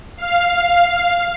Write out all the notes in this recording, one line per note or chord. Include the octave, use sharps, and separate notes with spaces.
F5